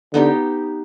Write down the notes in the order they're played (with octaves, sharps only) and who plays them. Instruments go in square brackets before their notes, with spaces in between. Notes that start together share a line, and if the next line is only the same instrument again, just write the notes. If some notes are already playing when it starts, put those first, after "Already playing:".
[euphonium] D3 [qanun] B3 D#4 G4